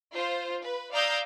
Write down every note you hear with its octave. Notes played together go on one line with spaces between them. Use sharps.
F4 C5
B4
D5 F5 A#5 D#6 E6 G6